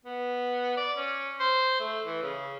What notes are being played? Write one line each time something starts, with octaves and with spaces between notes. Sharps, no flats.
B3
D5
C#4
C5
A3
E3
C#3